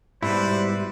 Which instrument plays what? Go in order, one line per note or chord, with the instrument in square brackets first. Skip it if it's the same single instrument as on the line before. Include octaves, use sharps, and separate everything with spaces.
[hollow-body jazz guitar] G#2 B2 [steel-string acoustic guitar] G3 [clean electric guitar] E4 [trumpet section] B4 C5 D5